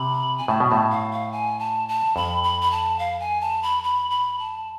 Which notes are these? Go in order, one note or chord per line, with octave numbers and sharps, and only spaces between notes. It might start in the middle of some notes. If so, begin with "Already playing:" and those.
Already playing: C3 B5
G#5
A2 A5
B2
A2 A5
F5
F5
G#5
A5
A5
F2 B5
B5
B5
A5
F5
G#5
A5
B5
B5
B5
A5